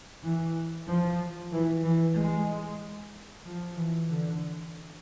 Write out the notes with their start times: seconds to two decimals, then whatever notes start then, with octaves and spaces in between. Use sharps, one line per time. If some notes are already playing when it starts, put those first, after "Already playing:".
0.24 E3
0.88 F3
1.52 E3
1.84 E3
2.16 G#3
3.45 F3
3.77 E3
4.09 D3